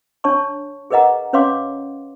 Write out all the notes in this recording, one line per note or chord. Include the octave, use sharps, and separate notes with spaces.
D4 C#5 A5 C#6
G#4 A#4 B4 D#5 F#5 A#5
C#4 B4 C#5 F5 C6 D6